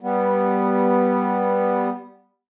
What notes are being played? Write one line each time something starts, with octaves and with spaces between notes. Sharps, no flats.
G3 B3